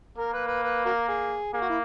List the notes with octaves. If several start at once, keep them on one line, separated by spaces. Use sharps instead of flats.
A#3 A#4
B4
B4
B4
F#4 A#4
G#4
A#3 G#4
F#4
E4